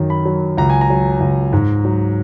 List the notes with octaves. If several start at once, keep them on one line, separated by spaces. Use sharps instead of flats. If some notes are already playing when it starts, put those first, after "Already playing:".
Already playing: F#2 D#3
B5
F#3
C#2 A#5
G#5
A#5
F#3
C#2
G#2
F#3